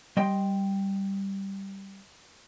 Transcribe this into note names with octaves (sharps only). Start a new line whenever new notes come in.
G3 D#5 G5 C6